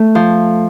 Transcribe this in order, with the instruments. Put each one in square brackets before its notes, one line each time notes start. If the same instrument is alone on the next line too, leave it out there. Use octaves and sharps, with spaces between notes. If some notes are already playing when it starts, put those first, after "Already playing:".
Already playing: [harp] A3
F3